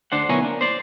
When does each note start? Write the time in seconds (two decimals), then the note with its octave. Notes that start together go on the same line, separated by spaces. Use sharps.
0.12 D2 D4 C5 F#5
0.29 B1 B3 E4 A#4 C#5 G#5
0.42 A#3 D4
0.61 C5 D5